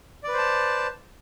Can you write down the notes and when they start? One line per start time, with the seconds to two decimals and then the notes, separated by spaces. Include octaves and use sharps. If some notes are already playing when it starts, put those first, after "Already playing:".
0.24 D5
0.28 B4
0.33 C5
0.38 A5